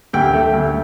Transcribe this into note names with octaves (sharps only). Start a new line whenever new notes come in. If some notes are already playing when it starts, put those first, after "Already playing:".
D2 G4 G5
A3
D2